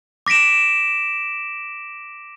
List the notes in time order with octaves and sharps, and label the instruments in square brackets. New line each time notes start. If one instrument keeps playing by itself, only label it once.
[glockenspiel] D6 A#6 B6 D7 E7